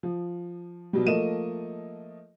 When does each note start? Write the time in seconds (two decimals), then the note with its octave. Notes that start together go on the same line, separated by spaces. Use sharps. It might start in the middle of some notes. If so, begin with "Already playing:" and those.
0.03 F3
0.93 B2 F#3 G3
1.06 F3 A3 A#3 D#5 D#7 E7